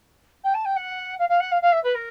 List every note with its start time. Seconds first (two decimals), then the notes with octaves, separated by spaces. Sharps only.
0.44 G5
0.54 A5
0.65 G5
0.76 F#5
1.19 F5
1.29 F5
1.40 F#5
1.51 F5
1.62 F5
1.72 E5
1.83 B4
1.95 A#4